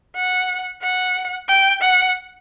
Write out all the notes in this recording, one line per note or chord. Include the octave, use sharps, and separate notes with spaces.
F#5
F#5
G5
F#5